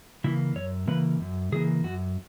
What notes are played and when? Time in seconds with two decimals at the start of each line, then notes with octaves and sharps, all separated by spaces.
0.24 C#3 E3 A#3 E4
0.55 F#2 C#5
0.87 C#3 E3 A#3 B4
1.20 F#2
1.52 C#3 E3 A#3 G#4
1.84 F#2 F#4